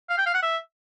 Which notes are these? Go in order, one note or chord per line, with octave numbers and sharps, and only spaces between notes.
F5
G5
F5
F#5
E5